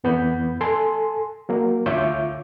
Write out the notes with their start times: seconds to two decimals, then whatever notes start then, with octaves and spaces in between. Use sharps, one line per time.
0.04 F2 E3 B3 B5 G6
0.61 A4 G#5 A5 C6
1.49 F#3 A#3
1.86 D2 F4 C#5 E5 D6 G6